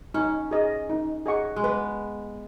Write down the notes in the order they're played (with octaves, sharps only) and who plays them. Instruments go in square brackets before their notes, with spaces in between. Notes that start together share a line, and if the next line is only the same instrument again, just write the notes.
[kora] C#4 [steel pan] D#4
[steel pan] G#4 D#5
D#4
G#4 D#5 F#5 C#6
[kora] G#3
[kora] B3 [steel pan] B4